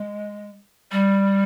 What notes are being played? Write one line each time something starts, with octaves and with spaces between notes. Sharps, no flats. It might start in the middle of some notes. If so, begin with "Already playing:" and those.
Already playing: G#3
G3